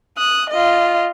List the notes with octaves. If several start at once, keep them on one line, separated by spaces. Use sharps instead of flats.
D#6 F#6
F4 D#5